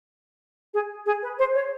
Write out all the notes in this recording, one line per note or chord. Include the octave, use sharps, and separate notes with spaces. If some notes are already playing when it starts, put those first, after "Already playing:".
G#4
G#4
B4
C5
C#5